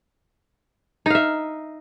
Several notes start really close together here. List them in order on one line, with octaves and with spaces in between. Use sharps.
D#4 F5 E5